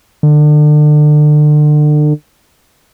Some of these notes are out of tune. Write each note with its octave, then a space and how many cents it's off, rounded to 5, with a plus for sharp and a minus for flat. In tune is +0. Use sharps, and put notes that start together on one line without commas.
D3 +35